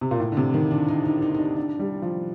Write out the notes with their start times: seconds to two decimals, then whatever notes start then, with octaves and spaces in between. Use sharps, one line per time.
0.01 C3
0.11 A#2
0.20 A2
0.32 D3
0.37 C3
0.54 D#3
0.71 D4
0.88 D#4
1.05 D#4
1.22 D#4
1.35 D#4
1.39 D4
1.57 D4
1.79 G3
2.02 F3